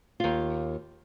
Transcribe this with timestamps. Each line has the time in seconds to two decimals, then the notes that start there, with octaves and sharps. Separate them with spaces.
0.20 D#2 F4